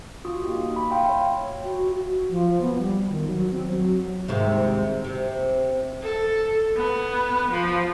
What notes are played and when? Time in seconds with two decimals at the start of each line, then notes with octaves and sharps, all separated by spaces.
0.25 F4 F#4 D#6
0.43 A#3 D#4 F#4 G4
0.76 B5
0.91 F5 G5 C6
1.06 C#5 E5
1.65 F#4
1.92 F#4
2.30 F3
2.61 B3
2.78 G3
3.09 D#3
3.27 F#3
3.51 C4
3.69 F#3
4.28 D#2 G#2 C3
5.04 C3
6.03 A4
6.76 B3
7.52 F3